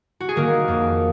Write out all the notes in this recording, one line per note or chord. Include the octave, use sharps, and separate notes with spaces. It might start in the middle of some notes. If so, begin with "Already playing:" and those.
F#4
G#4
D#3 A#3 A#4
F2